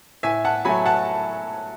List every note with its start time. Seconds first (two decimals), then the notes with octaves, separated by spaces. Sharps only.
0.23 A2 E5 G#5
0.44 F#5 A5
0.65 F#3 A3 G#5 B5
0.86 F#5 A5